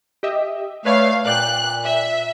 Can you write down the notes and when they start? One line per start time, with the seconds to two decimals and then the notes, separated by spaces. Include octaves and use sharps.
0.23 G4 D#5 E5
0.85 A3 B4 C#5 D5 F5
1.26 A#2 A#4 D5 G5 F#6
1.84 E5